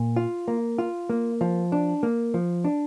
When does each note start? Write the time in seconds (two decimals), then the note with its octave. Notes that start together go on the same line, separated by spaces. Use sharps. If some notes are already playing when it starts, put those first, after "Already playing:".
Already playing: A#2
0.16 F4
0.48 A#3
0.78 F4
1.10 A#3
1.41 F3
1.72 D4
2.03 A#3
2.34 F3
2.65 D4